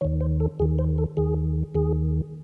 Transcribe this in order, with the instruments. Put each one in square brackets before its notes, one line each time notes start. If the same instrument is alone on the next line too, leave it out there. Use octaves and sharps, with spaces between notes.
[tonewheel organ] D#2 D#3 C#5
C5
A4
D#2 D#3 G#4
C5
A4
D#2 D#3 G#4
D#2 D#3 G#4